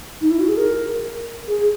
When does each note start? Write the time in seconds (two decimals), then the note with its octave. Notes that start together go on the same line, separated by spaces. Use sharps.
0.21 D#4
0.30 E4
0.39 F#4
0.48 G#4
0.57 A#4
1.47 G#4